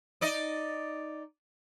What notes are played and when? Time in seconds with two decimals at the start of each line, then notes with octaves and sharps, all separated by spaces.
0.21 D#4 D5 D#5